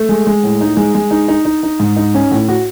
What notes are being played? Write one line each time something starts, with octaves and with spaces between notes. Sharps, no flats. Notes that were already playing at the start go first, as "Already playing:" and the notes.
Already playing: A3
G#3
G#3
A2
D#4
G#3
G#3
D#4
D#4
D#4
D#4
G#2
D#4
C#4
A2
F#4